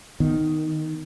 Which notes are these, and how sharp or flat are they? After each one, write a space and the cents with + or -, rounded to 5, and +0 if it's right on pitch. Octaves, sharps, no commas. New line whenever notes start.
D#3 +0 B3 +20